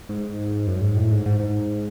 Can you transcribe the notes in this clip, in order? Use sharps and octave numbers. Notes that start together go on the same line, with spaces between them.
G#2
F#2
G#2
A2
G#2
G#2
G#2